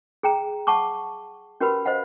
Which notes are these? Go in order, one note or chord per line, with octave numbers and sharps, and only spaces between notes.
G#4 G5 A#5
F#5 A5 C#6 D6
C#4 F#4 G4 A#4 B4 B5
C5 D#5 F5 F#5